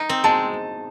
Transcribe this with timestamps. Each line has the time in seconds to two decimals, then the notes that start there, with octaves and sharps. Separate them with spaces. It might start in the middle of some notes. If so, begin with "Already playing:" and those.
Already playing: D#4
0.09 C4
0.24 G#3 A5